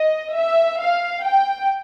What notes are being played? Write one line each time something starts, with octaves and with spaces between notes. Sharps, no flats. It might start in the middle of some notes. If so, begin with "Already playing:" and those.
Already playing: D#5
E5
F5
G5